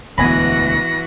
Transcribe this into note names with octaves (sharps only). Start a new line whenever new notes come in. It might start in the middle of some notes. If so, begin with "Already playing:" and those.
E1 D2 E3 B3 F#4 G#5 B5 A#6